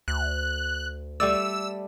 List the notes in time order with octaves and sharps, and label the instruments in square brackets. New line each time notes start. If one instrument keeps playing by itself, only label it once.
[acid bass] D2 [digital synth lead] F#6
[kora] G3 A3 D5 [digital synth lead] E6